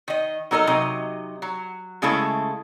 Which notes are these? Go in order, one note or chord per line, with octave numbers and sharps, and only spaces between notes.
D#3 D#5
F#3 D#4 A4 A#4 D#5
C3 F#3 D#4 D#5
F#3
C#3 G#3 A3 E4 A4